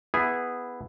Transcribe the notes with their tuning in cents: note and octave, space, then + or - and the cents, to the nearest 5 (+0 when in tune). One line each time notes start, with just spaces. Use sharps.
B3 +0 E4 +0 G#4 -10